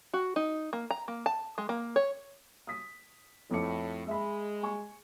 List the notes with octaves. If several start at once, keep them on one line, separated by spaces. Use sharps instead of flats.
F#4
D#4
A#3
A#5
A#3
A5
G#3
A#3
C#5
D#6 B6
F2 A2 D6 C#7
G#3 E5 B5
G#5 C#6